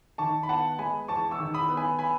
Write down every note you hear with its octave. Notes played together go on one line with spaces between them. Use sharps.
D#3 A5 C#6
B5
B3 F#5 A5
G#3 G#5 B5
E2 A5 C#6
C#6 E6
D#3
B5 D#6
B3
G#5 B5
G#5 B5